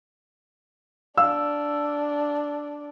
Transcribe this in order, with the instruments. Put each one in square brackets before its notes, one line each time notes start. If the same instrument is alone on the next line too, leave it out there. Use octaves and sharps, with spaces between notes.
[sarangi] D4 [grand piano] F5 E6